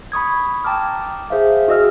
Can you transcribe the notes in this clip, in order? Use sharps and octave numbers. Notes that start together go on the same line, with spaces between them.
B5 C#6 D#6 G#6
G5 A5 A#5 D6 F6
G#4 C5 E5 F5
F#4 G#4 D#5 E6 F6